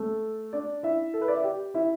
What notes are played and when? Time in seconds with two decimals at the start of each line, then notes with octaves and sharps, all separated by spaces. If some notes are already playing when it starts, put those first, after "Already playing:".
Already playing: A3 A4
0.53 D4 D5
0.83 E4 E5
1.14 A4
1.21 B4
1.28 D5
1.37 E5
1.44 G4 G5
1.74 E4 E5